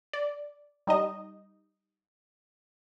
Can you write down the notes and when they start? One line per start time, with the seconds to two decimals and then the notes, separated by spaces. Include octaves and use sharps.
0.13 D5
0.87 G3 D#4 D#5